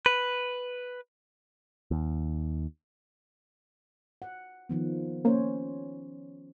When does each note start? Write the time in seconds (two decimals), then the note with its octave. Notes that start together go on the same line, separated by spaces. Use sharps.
0.06 B4
1.91 D#2
4.22 F#5
4.69 D#3 F3 B3
5.25 A#3 C#4 C5 C#5